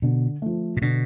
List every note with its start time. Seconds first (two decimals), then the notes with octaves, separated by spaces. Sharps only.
0.02 B2 D3
0.42 F3 A3
0.77 A#2
0.82 B2 D3